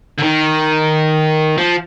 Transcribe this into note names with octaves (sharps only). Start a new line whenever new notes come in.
D3
D#3
F3